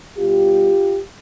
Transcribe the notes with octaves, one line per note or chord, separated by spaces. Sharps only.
B2 G3 F4 G4